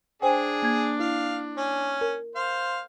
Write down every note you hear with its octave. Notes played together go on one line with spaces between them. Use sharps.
D4 G#4 C5 G5 G#5
A#3 G#6
E4 F5
C#4
A#4
C5 F5